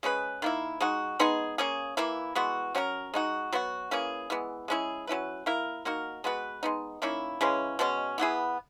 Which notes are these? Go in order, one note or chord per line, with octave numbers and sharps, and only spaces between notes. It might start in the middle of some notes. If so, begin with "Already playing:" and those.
G#3 C#4 G#4 B4
D#3 A#3 E4
G#3 D#4 F#4
G#3 B3 D#4 G#4
A#3 C#4 G#4
E3 A#3 E4
E3 G#3 B3 F#4
F#3 C#4 F#4 A#4
G#3 D#4 F#4
F#3 B3 F#4
E3 A#3 C#4 G#4
E3 G#3 B3
G#3 C#4 E4 G#4
F#3 C#4 E4 B4
A#3 E4 A#4
A#3 D#4 F#4 A#4
G#3 B3 F#4 B4
G#3 B3 D#4
D#3 A#3 C#4 E4
C#3 E3 G#3 C#4
B2 G#3 C#4
E3 B3 E4 G#4